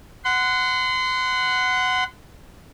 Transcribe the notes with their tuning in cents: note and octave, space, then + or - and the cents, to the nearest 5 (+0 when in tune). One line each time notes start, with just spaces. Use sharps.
F#5 +0 C6 -30